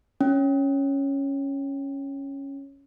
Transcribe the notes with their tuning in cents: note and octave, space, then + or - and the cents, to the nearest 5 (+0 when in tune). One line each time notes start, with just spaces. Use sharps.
C#4 -5